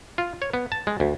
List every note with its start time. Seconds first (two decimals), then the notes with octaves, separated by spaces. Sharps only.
0.18 F4
0.42 C#5
0.53 B3
0.72 A5
0.87 G#3
1.00 D2